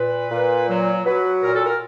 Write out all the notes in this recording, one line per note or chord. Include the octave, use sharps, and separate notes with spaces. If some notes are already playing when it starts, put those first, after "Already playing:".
Already playing: A#2 B4
A#2
F#3
F#3 B4
A#2 A#4
A4
A#4